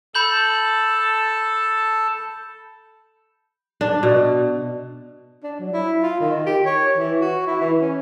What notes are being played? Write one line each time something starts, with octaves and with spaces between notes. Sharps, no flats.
A4 A5 B5 G6 F#7
D4
B2
D4
F#3
E4
F4
D#3
G4
C#5
E3
F#4
E4
E3
C#4